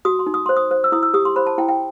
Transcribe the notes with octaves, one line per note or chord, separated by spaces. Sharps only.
F#4 D#6
C6
D#4
D#6
C5 C6
D#6
C5
E6
E4 D#6
E6
G4 D#6
C6
C5 B5
A5
E4 G5
G5